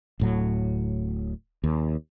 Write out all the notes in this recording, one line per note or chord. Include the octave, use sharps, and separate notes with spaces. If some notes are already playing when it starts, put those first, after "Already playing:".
D1 A2 F#3
D#2